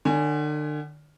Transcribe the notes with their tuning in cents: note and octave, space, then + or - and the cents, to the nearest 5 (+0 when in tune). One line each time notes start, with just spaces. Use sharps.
D3 +40 D5 -40 G#5 +0